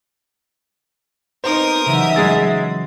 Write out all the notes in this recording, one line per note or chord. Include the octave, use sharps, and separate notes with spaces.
B3 C4 D#4 A#4 C5 D#6
C#3 E3 F#3 G3 D#4 E5
G#3 G#4 A6